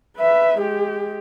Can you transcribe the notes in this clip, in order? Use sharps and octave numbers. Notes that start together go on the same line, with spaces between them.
B4 E5
G#3 G4